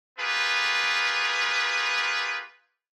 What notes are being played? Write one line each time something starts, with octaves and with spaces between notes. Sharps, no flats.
B3 F4 G4 G#4 A#4 B4